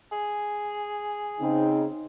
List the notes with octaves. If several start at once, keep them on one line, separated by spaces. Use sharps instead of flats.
G#4
C#3 C4 D#4